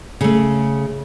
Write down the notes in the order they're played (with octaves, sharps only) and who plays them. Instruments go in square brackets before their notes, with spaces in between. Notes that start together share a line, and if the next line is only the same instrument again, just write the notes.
[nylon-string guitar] C#3 A3